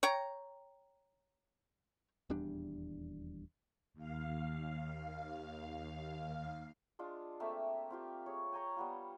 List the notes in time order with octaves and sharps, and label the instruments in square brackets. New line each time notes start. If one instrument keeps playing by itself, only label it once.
[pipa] C#5 G5 A#5
[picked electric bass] D#1 E2 G3 D4
[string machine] D#2 F5
[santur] G#3 D4 F4
A3 A#3 C4 E5
C4 F4 G4
G#4 C#5
G5 G#5 A#5 C#6
G3 B3 F4